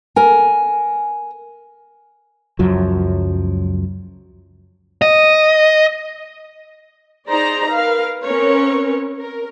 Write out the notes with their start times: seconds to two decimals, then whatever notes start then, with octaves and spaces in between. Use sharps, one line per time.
0.16 A#4 G#5
2.59 C#2 F#2 F3 F#3
5.02 D#5
7.29 D#4 G#4 C5 D5 A#5
7.73 A#4 B4 F5
8.23 C4 C#4 A#4 B4 C#5
9.20 A#4